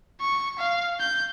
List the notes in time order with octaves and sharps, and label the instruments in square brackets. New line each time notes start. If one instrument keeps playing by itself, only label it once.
[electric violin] C#6
F5
G6